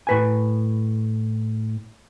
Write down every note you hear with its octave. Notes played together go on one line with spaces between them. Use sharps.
A2 B4 G#5